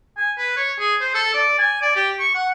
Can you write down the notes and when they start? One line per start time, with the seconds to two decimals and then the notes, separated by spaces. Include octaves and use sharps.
0.17 G#5
0.38 B4
0.57 C#5
0.79 G#4
1.01 C5
1.15 A4
1.34 D5
1.59 G#5
1.82 D5
1.96 G4
2.20 C#6
2.35 F#5